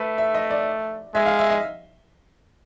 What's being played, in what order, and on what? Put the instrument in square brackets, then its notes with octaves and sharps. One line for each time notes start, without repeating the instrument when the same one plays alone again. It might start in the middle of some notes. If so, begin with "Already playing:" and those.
Already playing: [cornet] A3 [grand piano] B4
[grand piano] E5
D#5
D5
[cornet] G#3 [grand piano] E5
[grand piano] F5
E5
D#5